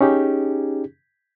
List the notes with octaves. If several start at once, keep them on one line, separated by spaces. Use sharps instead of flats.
C#4 D#4 G4 G#4